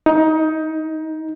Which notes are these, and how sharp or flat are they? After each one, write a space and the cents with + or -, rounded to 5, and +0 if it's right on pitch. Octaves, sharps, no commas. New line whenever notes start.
D#4 +20